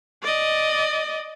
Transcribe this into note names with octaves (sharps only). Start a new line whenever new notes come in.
D5 D#5